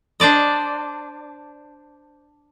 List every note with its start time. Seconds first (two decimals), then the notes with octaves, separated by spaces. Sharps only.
0.20 D4 C5 D5 D#5